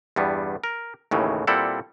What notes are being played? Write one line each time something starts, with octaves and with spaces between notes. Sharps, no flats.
E2 G2 G3 B3
A#4
D#2 A2 C#3 E3
A#2 G3 C4 E4 A4 F#5